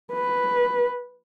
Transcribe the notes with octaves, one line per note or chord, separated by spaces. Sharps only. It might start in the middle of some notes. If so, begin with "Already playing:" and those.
B4